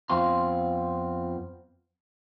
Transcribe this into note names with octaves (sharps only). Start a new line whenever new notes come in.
F2 B3 C4 F4 C6